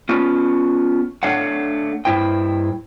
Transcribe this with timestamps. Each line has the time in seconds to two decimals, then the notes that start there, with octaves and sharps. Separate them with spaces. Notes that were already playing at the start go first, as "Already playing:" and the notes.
0.09 B3 C#4 F4
1.23 A3 D4 C#5 F5 F#5
2.05 G2 E4 C5 G5